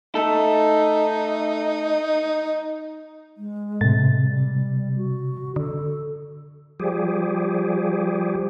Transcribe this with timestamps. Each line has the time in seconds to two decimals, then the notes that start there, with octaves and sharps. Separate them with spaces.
0.15 A3 D#4 A4
3.37 G#3
3.81 A2 C3 A6
4.21 G3
4.97 F#4
5.56 D3 A4
6.80 F3 G3 G4 G#4